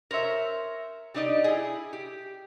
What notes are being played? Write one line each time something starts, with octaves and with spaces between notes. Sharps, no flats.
A#4 C5 C#5 E5
G3 D4 D#4 D5 D#5
E4 G#4
G4